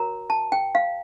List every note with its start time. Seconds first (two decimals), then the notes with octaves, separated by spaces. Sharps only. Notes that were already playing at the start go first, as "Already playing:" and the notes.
Already playing: F#4 A#4 C#5 A#5
0.30 A5
0.52 G5
0.75 F5